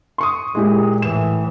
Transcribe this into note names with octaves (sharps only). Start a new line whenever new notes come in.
C6 C#6 D#6
A#2 G#3 E4 G4
A2 E3 E7